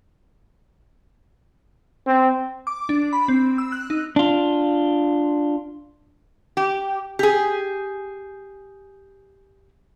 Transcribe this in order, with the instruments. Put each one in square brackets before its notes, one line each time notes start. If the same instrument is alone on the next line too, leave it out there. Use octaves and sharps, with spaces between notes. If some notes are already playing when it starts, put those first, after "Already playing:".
[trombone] C4
[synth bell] D6
D4
B5
C4
E6
F#6
D#4
[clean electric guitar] D4 F4
[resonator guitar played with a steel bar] G4
G4 G#4